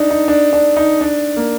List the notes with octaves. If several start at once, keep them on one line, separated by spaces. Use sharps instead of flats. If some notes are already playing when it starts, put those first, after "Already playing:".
Already playing: D4 D#4
D#4
D4
D4
D#4
D4
A#3